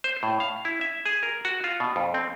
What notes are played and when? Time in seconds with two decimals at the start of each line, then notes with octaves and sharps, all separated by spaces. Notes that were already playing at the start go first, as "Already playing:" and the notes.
0.04 C5
0.23 A2
0.40 F5
0.65 E4
0.81 E5
1.06 G#4
1.23 A#4
1.45 F#4
1.64 F4
1.80 B2
1.96 F2
2.14 C4